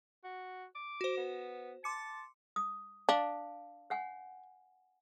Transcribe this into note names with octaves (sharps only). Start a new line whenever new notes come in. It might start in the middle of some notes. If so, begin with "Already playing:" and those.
F#4
D6
F#4 C5
B3
A5 C6 D6 C#7
D#6
D4 F5
C#5 F#5 G#5